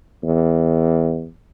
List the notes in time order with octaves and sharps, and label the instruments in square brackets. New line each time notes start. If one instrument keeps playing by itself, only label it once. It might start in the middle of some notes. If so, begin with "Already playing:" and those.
[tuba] E2